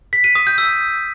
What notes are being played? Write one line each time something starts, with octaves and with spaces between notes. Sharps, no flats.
B6
D#7
D#6
G6
E6